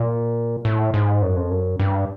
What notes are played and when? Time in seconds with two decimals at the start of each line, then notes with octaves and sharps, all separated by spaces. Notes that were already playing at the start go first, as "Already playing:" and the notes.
Already playing: A#2
0.65 A2
0.94 G#2
1.22 F#2
1.36 F2
1.50 F#2
1.79 G2